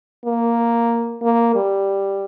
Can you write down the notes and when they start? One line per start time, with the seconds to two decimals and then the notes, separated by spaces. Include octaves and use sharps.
0.26 A#3
1.22 A#3
1.55 G3